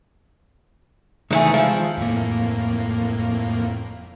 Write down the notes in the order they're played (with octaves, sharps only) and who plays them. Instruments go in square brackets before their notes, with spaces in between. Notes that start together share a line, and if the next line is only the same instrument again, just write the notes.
[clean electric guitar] D#3 G#3 [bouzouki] E3 A3 G#4
[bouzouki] F3
[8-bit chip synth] F2 A2 A#3